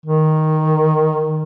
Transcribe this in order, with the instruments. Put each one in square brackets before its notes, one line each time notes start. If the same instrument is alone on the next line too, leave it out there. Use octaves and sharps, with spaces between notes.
[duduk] D#3